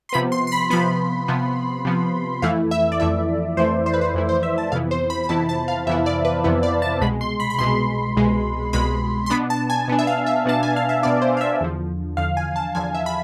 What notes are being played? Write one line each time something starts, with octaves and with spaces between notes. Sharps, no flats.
C6
C3 F3 B3 B5
C6
C6
B5
C3 F3 B3 B5
C3 F3 B3
C3 F3 B3
F2 E3 A3 E4 F5
E5
D5
F2 E3 A3 E4 E5
F2 E3 A3 E4 C5
C5
B4
C5
F2 E3 A3 E4
C5
E5
A5
F2 C3 E3 B3 E4 F5
C5
B5
B5
F2 C3 E3 B3 E4 A5
A5
F5
F2 C3 E3 B3 E4 E5
D5
B4
F2 C3 E3 B3 E4
D5
A5
C2 B2 G#3 B5
C6
B5
B5
C2 B2 G#3 C6
C2 B2 G#3
C2 B2 G#3 B5
C6
B2 B3 D4 B5
A5
G#5
B2 B3 D4
E5
F5
E5
B2 B3 D4 A5
G#5
F5
E5
B2 B3 D4 D5
C5
F5
E5
E2 D3 F3
E2 D3 F3 F5
G#5
A5
E2 D3 F3 G#5
E5
B5